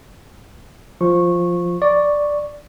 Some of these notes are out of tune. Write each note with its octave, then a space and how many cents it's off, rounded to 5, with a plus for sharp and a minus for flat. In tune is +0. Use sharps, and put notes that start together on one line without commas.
F3 +0 C#6 -15
D5 +0 C#6 +0